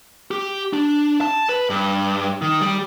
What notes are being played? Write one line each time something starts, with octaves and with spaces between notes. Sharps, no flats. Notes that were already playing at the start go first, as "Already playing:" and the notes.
G4
D4
A5
B4
G2
D#3
G3